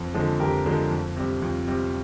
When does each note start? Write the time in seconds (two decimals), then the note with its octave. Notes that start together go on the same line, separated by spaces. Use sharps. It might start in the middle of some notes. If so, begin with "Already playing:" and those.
Already playing: F2
0.14 D3 F3 G#3
0.40 F2 G4 A#4
0.65 D3 F3 G#3
0.91 F2
1.16 C3 G3
1.42 F2
1.68 C3 G3